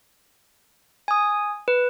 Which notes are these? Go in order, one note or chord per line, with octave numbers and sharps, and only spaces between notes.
G#5 D#6
B4